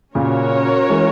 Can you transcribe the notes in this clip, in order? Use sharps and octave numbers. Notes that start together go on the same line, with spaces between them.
A#2 C#3 C#4 F#4 A#4 C#5
E3 G#3